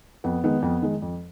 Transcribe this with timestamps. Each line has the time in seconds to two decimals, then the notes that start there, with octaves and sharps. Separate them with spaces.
0.24 F2 B3
0.44 D#3 G#3 B3
0.62 F2 B3
0.82 D#3 G#3
1.02 F2